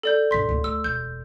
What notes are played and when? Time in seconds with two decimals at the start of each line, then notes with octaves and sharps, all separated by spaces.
0.03 A4 D5 G6
0.31 G2 C#4 C6 B6
0.49 D1 A#3
0.64 A3 E6
0.84 E1 G6